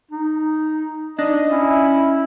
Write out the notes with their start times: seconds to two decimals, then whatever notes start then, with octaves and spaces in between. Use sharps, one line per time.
0.11 D#4
1.19 D4 D#4 D#5
1.51 C#4 E4